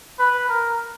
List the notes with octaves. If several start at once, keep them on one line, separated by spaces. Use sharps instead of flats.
B4
A#4